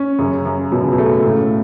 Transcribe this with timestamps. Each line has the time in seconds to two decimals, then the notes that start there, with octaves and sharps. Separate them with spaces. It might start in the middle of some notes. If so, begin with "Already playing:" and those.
Already playing: C#4
0.18 F#2 C#3
0.46 F#2
0.72 F#2 B2
0.82 C#3
0.92 B2
0.98 A3
1.24 A2 C#3